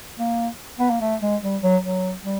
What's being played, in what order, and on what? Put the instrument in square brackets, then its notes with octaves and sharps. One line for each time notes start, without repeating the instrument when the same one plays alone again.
[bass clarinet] A#3
B3
A#3
A3
G#3
G3
F#3
F#3
G3